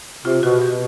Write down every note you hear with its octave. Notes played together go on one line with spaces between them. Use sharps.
C3 F4
B2 F#4
B2 G4